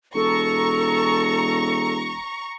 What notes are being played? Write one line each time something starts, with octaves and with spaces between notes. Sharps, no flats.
E1 A4 A#5 C#6